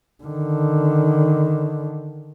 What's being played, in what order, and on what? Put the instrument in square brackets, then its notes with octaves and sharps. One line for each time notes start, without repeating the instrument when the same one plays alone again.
[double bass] D3 D#3